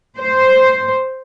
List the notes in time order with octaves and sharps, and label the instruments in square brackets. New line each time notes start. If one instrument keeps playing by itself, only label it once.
[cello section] C5